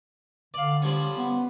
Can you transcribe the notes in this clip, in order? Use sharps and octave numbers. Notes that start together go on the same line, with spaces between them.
D3 D5 F5
F3 G3 C#4
B3